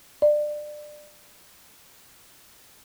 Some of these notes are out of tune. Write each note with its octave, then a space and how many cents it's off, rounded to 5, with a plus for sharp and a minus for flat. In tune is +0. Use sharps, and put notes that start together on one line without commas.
D5 +25